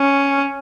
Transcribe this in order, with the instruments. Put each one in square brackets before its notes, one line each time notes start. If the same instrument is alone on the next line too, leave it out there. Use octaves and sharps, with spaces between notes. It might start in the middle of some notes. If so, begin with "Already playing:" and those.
Already playing: [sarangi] C#4